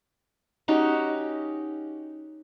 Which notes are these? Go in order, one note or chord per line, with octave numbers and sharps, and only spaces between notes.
C#4 D#4 F#4 G4